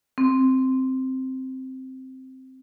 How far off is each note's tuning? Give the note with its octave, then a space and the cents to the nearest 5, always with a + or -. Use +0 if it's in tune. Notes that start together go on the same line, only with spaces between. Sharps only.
C4 +0